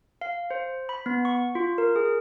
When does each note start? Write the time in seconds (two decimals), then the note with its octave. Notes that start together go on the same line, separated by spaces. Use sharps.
0.21 F5
0.51 C5
0.89 B5
1.06 B3
1.25 C#6
1.55 F4
1.78 A#4
1.96 G#4